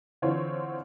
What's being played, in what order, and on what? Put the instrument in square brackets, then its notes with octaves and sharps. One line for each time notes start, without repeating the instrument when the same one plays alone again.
[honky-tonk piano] D3 E3 C4 F4 C#5